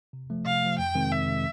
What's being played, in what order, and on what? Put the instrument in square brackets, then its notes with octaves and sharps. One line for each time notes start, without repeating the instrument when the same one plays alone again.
[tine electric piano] C3
F3 A3
[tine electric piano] C3 [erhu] F5
[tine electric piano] F3 A3
[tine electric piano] F2 [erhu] G5
[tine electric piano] C3 D#3 G#3 C4
[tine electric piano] F2 [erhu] E5
[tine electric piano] C3 D#3 G#3 C4